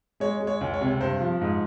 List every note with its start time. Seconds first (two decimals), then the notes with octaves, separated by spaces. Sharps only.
0.20 G#3 C#5
0.40 G#3
0.47 C#5
0.61 C#2
0.74 C#5
0.81 C3
1.01 G2 C5
1.21 F3
1.41 G#2